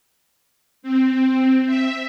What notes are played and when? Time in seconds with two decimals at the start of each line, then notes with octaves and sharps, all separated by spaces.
0.82 C4
1.66 E5